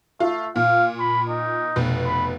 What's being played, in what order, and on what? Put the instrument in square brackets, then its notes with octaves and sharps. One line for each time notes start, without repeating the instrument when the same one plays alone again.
[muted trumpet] A3 [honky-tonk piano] F4
[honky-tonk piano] A#2 [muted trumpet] F5
[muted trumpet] B5
D#4
[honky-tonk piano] F1 B2
[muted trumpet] B5